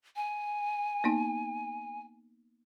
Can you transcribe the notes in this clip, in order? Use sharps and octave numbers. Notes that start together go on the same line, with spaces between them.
G#5
A#3 B3 D#4